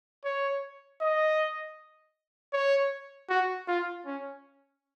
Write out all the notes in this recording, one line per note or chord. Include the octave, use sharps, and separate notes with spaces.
C#5
D#5
C#5
F#4
F4
C#4